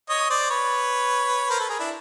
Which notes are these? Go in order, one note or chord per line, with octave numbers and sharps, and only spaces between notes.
C#5 D#5
C5 D5
B4 C#5
A#4 C5
A4 B4
G#4 A#4
D4 E4